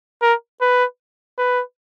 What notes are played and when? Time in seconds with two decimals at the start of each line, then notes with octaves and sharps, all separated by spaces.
0.22 A#4
0.61 B4
1.38 B4